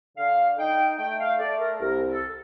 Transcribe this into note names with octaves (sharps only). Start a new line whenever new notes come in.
D3 F5
D#4 G5
A3 G5
F5
A3 D5
A#4
C2 A#4
A4